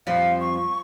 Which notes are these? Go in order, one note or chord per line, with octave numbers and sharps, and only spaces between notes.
F2 F3 G3 F5
C#6